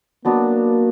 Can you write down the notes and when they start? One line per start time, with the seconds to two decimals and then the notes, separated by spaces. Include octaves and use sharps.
0.25 F#3 A#3 B3 D4 F#4